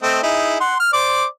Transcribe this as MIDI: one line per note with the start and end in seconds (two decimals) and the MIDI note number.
0.03 0.21 57
0.03 0.21 60
0.03 0.21 75
0.23 0.59 63
0.23 0.59 64
0.23 0.59 68
0.60 0.75 78
0.60 0.75 84
0.80 0.90 89
0.93 1.25 72
0.93 1.25 74
0.93 1.25 86